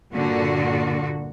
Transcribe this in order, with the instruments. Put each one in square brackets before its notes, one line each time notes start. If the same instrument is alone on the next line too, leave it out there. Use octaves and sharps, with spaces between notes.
[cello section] G2 A#2 D3 F#4